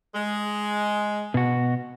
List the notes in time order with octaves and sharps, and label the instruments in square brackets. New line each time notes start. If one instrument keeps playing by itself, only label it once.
[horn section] G#3
[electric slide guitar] B2 F#4